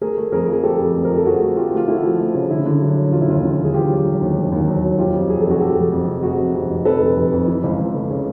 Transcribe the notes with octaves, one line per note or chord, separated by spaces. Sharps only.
A3 G#4 A#4
A3
F2 G#4 A#4
F3 G#4
A3 G4 A4
F2
F2
A#4
F3
A4
F2 F#4 G#4
A3
A3 F4 G4
A3 F4
A3 E4 F#4
F3
A3
C#3
D3 E4
D3
F#3
F#3
E1 F4
E4
D#2 F4
D3
E1 G#4
E1 F4 G4
F#3
F#3
D#2
E1
D#2
F#3
F#3
F1 F4 G4
F2
F2 G#4
A4
F1 F#4 G#4
F1 G4 A4
F1
F2
C3
F1 F#4 G#4
C3
F2
F1
C3 A4 B4
F1
F1
F2
E3
C#2
C#2
A3
C#3